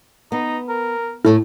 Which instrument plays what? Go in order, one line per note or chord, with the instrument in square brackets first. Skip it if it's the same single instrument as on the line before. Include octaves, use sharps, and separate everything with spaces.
[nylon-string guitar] B3 [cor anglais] D#4
[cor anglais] A#4
[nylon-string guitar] A2 A4 [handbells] E4